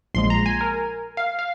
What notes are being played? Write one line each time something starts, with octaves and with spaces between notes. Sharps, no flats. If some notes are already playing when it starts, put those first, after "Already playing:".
A#1 A#2 F3 G#3 C6
A#5
G#5
A#4
F5
F5